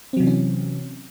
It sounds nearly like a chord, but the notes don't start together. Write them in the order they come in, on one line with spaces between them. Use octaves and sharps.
C4 F#3 C3 E3 C#4